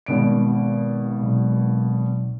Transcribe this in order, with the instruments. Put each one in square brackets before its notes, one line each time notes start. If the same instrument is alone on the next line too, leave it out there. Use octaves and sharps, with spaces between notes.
[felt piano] G#1 B2 D7
[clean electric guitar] B1